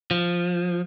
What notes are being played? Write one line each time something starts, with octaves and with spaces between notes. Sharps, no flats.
F3